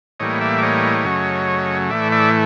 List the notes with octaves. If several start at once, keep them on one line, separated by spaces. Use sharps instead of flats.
A2 E3 G3 A#3 C#5 D#5
D5 E5
D5
C#5 D#5
F#2 C#3 F#3 A3
A2 E3 A3 D5 E5
D5 E5